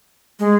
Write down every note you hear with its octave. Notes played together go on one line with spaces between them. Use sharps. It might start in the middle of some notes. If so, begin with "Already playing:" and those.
G#3